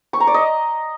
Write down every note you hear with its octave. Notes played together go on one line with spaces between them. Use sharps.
C#6
A#5
D5
D#5